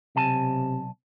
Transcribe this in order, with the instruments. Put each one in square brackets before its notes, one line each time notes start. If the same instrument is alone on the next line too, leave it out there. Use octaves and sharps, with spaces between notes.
[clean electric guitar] B1 G#5 A5 [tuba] C3